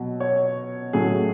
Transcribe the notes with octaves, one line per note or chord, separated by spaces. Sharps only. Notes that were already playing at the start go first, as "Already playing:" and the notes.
Already playing: B2 F#3
C#5
A2 F#3 A3 G#4